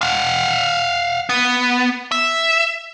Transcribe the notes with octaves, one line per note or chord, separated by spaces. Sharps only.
F5 F#5
B3
E5